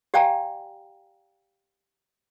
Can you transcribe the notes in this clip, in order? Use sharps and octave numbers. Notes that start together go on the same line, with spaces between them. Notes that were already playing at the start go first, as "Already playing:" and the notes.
G4 D5 F5 G5 G#5 A#5